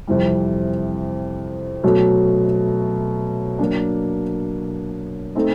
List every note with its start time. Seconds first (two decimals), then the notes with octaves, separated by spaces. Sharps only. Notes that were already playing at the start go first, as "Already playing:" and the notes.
0.07 F2 C3 E3 G3
1.83 B2 F#3 A3
3.59 F#3 A#3 D4
5.35 A3 C4 D#4